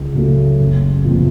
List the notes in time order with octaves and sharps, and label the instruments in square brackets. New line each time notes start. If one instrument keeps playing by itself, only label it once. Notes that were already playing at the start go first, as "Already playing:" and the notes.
Already playing: [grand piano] C#2
C#3 F#3 A3 C#4
F#1
E2 C3 F3 A#3